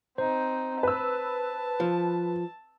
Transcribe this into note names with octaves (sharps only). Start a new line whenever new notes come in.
C4 D#4 C5
B4 A5 E6
F3